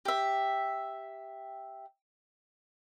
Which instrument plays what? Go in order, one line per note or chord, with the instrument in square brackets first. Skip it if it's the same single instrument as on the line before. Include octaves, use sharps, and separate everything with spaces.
[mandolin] G4 E5